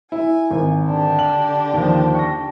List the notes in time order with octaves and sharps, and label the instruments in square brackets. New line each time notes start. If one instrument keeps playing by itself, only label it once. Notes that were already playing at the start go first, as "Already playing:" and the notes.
[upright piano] E4 [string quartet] G#5
[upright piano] G#1
[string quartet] D3 D4 G4
[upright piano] F#7
D#2 F3
C#6 A#6